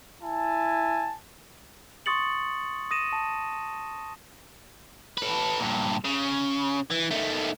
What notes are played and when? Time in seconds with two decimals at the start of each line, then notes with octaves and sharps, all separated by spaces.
0.22 E4 G#5 A5
2.06 C6 C#6 D#6 A6 C#7 F#7
2.91 D#6 A#6 D#7 E7
3.13 A5
5.18 A4 B4
5.60 G2 A#2
6.04 C#3
6.90 E3
7.11 D#3 A3